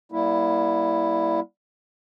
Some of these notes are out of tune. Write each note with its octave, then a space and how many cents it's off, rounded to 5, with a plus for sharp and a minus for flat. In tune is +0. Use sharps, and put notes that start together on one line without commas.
G3 -5 A#3 +35 E4 +0